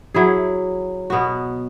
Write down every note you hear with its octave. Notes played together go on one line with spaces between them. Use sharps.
F#3 E4 G#4
B2 B3 F#4